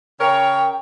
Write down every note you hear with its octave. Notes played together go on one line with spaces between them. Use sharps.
C#3 A#4 C#5 G5